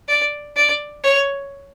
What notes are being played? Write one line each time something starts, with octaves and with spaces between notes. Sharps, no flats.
D5
D5
C#5